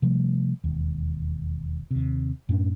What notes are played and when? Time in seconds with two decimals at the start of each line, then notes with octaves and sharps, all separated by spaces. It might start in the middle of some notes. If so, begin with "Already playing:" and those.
0.02 C3 F3 G3 A3
0.64 E1 D#2
1.91 D#2 C3
2.49 F#2 A2 C#4 D4